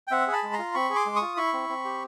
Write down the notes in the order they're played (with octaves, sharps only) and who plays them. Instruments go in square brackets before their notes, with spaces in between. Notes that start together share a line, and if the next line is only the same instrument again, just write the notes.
[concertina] G5
C4 E5 F#5
G#4
A5 B5
G#3
A#5 C6
F4
C4 B5 C#6
G#4
C6 D6
G#3
C#6 D#6
F4
E4 B5 C#6
C4
C4
G4